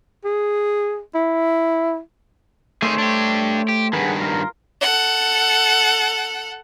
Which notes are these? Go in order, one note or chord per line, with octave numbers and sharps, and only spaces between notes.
G#4
E4
D#3 A3 G#4 C5 C#5
D4 G4
G4
G2 D#3 G#4 B4 F#5
F4 A#4
A4 F#5